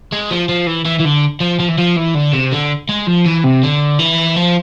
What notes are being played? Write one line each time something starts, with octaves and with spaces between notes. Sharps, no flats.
G#3
F3
F3
E3
E3
E3
D3
F3
F3
E3
F3
E3
D3
C3
D3
G#3
F3
E3
C3
D3
E3
F3